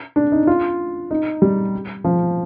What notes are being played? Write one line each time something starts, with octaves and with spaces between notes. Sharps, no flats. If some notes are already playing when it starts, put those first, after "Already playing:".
D4
D#4
F4
D#4
G3
F3